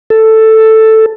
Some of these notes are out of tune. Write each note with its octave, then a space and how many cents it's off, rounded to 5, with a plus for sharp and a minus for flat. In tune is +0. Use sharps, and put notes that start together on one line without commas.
A4 +5